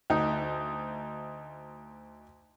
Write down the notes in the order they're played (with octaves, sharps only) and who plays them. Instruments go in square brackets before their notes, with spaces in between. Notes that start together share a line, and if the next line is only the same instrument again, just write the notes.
[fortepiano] D2 D#4